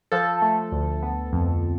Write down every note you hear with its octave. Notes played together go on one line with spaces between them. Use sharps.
F3 A4
A3
D2
B3
F2